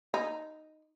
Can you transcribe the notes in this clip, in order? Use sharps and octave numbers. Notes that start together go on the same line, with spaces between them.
D#4